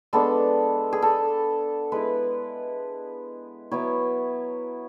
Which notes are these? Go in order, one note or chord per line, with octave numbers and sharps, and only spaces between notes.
G#3 B3 D4 A4
G#4
A4
G#3 B3 E4 B4
F#3 B3 E4 C#5